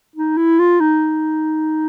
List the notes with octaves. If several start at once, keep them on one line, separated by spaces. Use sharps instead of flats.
D#4
E4
F4
D#4